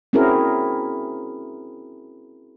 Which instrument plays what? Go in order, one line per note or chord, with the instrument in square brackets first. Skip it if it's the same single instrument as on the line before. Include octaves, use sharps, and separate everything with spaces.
[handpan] C4 C#4 E4 F#4 G#4 A#4